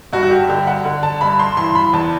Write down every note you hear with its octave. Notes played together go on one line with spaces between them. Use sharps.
G2 F#4
F#4
G4
D3 G4
F#5
D3
A5
G2 B5
C6
E3 C6
B5
E2 A5